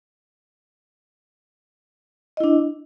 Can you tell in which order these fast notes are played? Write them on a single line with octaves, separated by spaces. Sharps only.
D#5 E4 D4